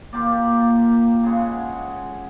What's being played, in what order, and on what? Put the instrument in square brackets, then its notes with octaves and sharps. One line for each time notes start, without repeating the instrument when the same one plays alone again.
[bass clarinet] A#3 [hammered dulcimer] F4 G4 D5
[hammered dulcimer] C#3 G#3 F#5